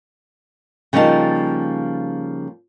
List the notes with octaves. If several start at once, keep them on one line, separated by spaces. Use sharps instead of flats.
C#3 F3 G3 A#3 D#4 A5